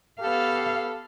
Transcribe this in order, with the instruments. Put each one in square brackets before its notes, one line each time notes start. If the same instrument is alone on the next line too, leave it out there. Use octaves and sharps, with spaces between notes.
[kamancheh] B3 G4 [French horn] A4 [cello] F5